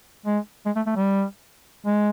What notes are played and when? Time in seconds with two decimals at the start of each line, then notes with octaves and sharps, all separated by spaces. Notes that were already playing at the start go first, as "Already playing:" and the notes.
0.26 G#3
0.66 G#3
0.76 A3
0.86 A3
0.96 G3
1.86 G#3